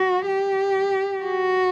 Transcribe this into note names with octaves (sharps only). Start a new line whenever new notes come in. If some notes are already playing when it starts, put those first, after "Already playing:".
Already playing: F#4
G4
F#4